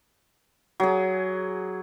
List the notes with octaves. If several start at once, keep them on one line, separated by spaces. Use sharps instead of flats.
F#3 G#4